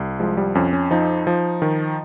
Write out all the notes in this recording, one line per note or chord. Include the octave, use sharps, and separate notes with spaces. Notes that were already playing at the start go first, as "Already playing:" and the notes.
Already playing: C2
F3 G#3
G3
F2 C#4
C#4
F3 D#4
F3
D#3